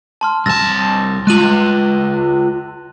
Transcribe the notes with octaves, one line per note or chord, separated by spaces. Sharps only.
A5 C6 F6
C2 A5 E6 A6 A#6
G#3 F4 F#6 D#7 F#7